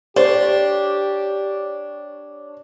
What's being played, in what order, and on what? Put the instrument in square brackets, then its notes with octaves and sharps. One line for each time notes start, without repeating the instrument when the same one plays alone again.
[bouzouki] D4 [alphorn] G4 [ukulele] C5 [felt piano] C#5